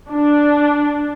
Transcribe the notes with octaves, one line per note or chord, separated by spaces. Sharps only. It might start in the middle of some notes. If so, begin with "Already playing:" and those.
D4